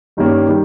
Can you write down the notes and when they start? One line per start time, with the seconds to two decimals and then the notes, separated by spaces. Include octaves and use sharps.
0.17 G2 D#3 G3 A#3 C#4
0.49 D#3 G3